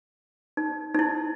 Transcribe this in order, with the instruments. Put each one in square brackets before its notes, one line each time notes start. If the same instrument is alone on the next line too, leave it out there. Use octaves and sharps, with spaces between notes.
[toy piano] D#4
D#4
E4